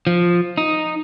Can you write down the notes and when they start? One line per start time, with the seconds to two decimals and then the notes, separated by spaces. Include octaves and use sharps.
0.07 F3
0.58 D#4